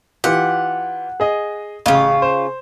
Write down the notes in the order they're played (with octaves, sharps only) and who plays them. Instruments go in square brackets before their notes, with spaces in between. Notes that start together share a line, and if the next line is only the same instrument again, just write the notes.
[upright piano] E3 F4 G4 [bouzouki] F#5
[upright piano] G#4 D#5
[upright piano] A1 [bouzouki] C#3 F4
[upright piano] C5